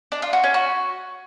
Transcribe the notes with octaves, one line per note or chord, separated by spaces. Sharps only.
D4
F4
F#4
C#4
F#4